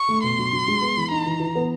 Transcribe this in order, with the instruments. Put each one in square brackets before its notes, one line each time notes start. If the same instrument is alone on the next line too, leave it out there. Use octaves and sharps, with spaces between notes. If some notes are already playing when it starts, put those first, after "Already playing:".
Already playing: [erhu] C#6
[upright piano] A3
[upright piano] B2 [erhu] C6
[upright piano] F#3
F#3
G#3
B3
E3
[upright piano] D#4 [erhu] A#5
[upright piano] E3
E3
B3